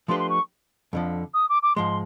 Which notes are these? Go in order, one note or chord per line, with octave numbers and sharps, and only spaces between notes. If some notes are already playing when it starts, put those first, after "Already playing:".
F3 A3 D4 G4 B4 C6
C6
C#6
F2 D3 F3
D#6
D6
D6
G#2 F3 G#3 C6